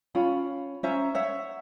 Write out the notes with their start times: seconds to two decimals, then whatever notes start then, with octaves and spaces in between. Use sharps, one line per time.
0.15 C#4 F4 G5 B5
0.83 C#4 C5 E5 A#5
1.15 C#5 E5 F#5